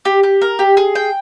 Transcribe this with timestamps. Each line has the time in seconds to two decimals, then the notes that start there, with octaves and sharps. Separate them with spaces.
0.05 G4
0.23 G4
0.42 A#4
0.59 G4
0.77 G#4
0.95 G5